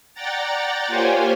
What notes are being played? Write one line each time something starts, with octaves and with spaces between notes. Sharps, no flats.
D5 F#5 G5 A#5 A6
A#3 F4 G4 C5 C#5 G#5